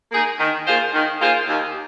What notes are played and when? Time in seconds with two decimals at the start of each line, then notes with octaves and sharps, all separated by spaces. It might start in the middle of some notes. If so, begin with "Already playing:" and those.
0.12 A#3 D#4 G#4
0.39 D#3
0.66 A#3 F4 G#4 C5
0.94 D#3
1.21 A#3 F4 G#4 C5
1.48 D#2